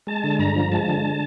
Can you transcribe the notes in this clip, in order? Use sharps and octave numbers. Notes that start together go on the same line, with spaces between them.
G#3 A5
D3
G2 A#5
F3
G#3 A5
D3